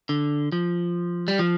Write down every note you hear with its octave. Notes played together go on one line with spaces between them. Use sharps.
D3
F3
G3
F3